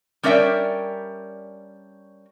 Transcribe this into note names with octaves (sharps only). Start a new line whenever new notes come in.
G3 C#4 D4 A#4 E5 G5